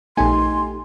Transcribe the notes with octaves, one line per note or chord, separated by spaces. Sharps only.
A#1 A3 B3 D#4 G4 G#5 C6